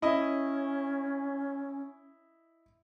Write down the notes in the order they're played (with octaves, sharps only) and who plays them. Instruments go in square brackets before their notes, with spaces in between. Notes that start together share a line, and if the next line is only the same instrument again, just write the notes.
[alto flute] C#4 [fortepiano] E4 D#5